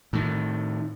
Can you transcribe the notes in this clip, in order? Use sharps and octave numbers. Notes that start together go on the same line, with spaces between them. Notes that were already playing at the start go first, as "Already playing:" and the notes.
A2 D#3